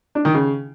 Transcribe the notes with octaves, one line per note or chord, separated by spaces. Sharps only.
D4
D#3
C#3